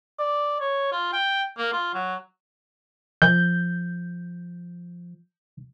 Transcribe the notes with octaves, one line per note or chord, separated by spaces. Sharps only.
D5
C#5
F4
G5
A#3
F4
F#3
F3 G6